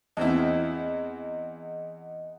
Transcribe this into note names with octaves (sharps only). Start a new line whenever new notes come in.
E2 C4 E4 D#5 F#5